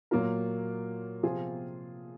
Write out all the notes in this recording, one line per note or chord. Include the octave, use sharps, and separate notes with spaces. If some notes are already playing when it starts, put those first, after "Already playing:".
A#2 F#3 A#3 F4 A#4
C3 F3 C4 F4 G#4